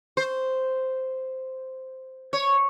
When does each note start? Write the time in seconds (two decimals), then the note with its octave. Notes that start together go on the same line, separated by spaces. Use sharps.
0.17 C5
2.33 C#5